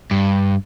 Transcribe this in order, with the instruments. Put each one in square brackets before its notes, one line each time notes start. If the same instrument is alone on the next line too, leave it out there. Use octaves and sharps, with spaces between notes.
[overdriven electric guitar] G2